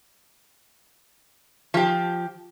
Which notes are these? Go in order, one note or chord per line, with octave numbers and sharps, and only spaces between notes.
F3 G4